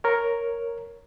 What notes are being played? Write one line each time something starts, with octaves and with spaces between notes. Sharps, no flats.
A#4 C#5